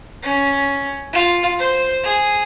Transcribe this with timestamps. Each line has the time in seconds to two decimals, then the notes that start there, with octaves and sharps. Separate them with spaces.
0.23 C#4
1.13 F4
1.59 C5
2.04 G#4